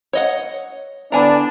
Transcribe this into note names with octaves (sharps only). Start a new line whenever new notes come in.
C#5 D#5 F#5
D3 B3 D4 E4 G#5 A#5